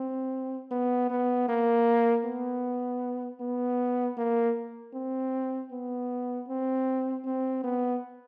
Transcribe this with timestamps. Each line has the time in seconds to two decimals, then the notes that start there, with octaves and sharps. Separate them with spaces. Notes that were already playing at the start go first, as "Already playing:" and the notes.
Already playing: C4
0.71 B3
1.10 B3
1.48 A#3
2.25 B3
3.41 B3
4.17 A#3
4.94 C4
5.72 B3
6.48 C4
7.25 C4
7.64 B3